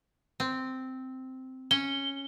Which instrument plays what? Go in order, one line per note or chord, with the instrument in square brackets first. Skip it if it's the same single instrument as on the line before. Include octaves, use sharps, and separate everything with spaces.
[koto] C4
[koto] C#4 [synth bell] G7